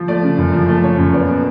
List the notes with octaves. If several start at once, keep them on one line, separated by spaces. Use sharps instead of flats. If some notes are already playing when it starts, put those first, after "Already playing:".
Already playing: F3
A3 D5
C#3
F#2
F3
A3
C#3 C#5
F#2
B3 D5
B2